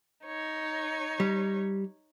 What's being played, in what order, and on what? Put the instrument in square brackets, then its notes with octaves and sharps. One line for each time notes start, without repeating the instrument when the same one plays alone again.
[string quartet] D#4 C#5
[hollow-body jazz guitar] G3